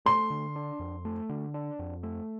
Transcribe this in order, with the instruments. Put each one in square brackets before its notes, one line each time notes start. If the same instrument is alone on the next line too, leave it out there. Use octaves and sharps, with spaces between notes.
[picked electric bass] A3 [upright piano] C6
[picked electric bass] D3
D4
F2
A3
D3
D4
F2
A3